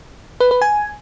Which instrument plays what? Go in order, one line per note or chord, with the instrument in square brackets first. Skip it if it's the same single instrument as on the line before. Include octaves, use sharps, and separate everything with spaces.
[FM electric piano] B4
B4
G#5